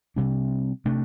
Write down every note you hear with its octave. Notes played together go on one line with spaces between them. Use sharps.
C3 G3 D4
C3 A3 D4